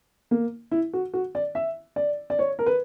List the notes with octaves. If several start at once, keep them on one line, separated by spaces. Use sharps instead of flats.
A#3
E4
F#4
F#4
D5
E5
D5
D5
C#5
A#4
B4